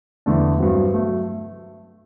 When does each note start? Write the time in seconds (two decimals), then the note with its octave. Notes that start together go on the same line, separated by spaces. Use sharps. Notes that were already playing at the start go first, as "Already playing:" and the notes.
0.26 E2 D3 A3 D4
0.58 G2 F#3 C4 F#4
0.93 F#3 A3